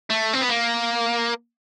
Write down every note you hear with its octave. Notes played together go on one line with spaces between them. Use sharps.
A3
C4
B3
A#3